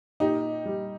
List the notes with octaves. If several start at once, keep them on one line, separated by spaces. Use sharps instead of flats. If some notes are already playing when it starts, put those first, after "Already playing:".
A#2 D#4 G4
G3